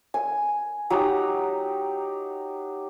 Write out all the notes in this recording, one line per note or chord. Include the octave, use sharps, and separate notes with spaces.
G#5
F#3 D#4 G4